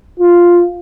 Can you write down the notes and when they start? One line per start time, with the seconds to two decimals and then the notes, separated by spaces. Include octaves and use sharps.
0.20 F4